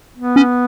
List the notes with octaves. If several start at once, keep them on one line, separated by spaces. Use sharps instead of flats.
B3
C#4